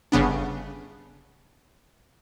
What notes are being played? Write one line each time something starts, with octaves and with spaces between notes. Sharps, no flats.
G1 C#3 B3 D4